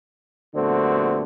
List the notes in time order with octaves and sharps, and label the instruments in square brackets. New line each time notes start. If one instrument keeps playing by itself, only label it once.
[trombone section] A#1 D3 A3 B3 C4 F#4